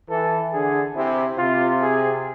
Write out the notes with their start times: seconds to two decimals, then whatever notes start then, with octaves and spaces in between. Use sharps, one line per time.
0.09 E3 A4
0.53 D3 G#4
0.96 C3 E4
1.38 C3 F4
1.82 G#4